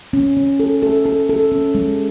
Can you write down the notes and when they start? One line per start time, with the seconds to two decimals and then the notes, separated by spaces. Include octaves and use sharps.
0.13 C#4
0.37 C#4
0.60 A4
0.83 A4
1.06 A4
1.29 A4
1.52 C#4
1.75 G#3